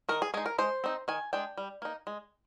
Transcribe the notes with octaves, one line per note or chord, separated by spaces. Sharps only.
D#3 A#4
G#4
G#3 D#4 G#4
A#4
G#3 C5
C4 D#4
D#3 G#5
G#3 D4 G5
G3
A#3 D#4
G#3